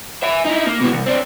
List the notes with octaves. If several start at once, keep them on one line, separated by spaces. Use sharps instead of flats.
E5 G#5
D#4 E4
A#3
B2 E3
C2
C4 D4